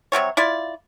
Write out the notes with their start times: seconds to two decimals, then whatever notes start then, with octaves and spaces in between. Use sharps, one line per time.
0.12 C3 F#3 G3 C#5
0.37 E4 F4 D5